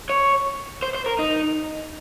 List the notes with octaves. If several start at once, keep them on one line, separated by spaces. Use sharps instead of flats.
C#5
C5
C5
A#4
D#4